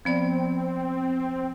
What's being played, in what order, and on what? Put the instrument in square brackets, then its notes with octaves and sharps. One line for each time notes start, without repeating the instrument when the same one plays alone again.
[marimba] F3 B3 D5 [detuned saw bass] C4